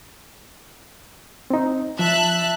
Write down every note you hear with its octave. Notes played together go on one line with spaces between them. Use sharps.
C4 D#4
F3 E5 A5 F#6